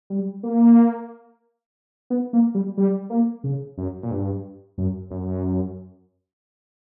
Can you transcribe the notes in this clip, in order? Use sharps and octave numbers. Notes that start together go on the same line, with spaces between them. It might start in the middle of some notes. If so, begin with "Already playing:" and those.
G3
A#3
B3
A#3
G3
G3
A#3
C#3
F#2
A#2
G2
F#2
F#2